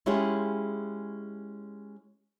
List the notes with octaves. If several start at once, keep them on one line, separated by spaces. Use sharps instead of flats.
G#3 C#4 E4 F4 G4 G#4